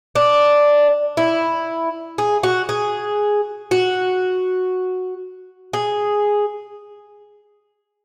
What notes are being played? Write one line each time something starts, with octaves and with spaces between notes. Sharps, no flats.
D4
E4
G#4
F#4
G#4
F#4
G#4